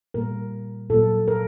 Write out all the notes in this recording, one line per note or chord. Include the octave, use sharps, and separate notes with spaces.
A#2 G3 A#3 A#4
A#2 F#3 A#3 A4
A#4